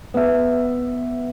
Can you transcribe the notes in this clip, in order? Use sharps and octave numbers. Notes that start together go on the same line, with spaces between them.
B3 E5